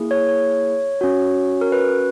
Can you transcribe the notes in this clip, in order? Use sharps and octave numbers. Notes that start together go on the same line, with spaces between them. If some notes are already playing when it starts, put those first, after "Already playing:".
Already playing: A#3 E4 G#4
C#5
C#5
C#4 F#4
A#4
B4